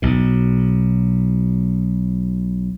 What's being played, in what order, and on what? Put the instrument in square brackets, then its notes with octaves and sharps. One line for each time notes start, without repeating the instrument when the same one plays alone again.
[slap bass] B1 B2